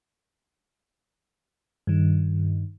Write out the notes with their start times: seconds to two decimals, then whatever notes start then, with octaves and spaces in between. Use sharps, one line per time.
1.87 G2 D#3